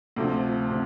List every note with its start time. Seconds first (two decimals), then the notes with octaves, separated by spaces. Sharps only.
0.16 D2 C3 F3
0.70 C3